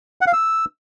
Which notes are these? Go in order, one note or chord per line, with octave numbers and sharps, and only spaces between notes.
F#5
F5
E6